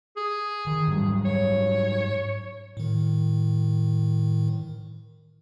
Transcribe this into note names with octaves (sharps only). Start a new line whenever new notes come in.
G#4
D#3
G#2 F#3 G3
C#5
A2 D#3